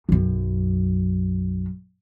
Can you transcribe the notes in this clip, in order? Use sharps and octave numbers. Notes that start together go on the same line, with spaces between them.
B1 F#2